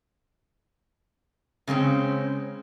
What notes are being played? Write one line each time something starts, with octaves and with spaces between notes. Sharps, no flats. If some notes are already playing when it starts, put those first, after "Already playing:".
C#3 G#3 C4 C#4